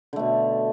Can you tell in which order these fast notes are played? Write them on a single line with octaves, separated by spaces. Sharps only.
D3 A3 B2